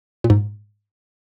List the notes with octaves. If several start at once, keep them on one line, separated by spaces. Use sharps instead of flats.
A#2
G#2